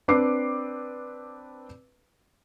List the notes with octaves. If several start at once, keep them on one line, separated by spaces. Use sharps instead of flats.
C4 D4 B4 D6 C7